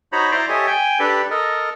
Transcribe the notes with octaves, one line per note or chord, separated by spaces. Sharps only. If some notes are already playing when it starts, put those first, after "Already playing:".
D#4 F#4 C5 C#5 A#5 B5
E4 C5 D5 A#5 C6 D6
G4 A4 C#5 D#5 E5 G#5
G5 G#5
D4 G4 A4 B4
A4 A#4 D#5